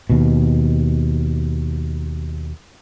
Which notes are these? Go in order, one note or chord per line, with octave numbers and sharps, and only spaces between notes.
D#2 B2